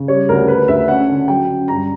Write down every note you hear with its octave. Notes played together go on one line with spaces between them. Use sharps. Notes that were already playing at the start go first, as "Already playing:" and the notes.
Already playing: C#3
G3 C#5
D2 A#4
D2 B4
D2 E5
C#4 F#5
D3
F#3 G5
C#4
G2 A#5